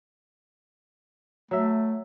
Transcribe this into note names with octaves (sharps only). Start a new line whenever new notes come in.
F#3 A3 E5